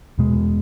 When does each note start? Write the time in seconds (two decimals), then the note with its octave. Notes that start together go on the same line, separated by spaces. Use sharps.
0.17 E2 B2 G#3